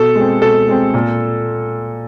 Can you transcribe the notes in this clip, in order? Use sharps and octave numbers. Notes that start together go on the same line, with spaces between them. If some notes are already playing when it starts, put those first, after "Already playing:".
Already playing: B2 A4
G#3 C4
B2 A4
G#3 C4
A#2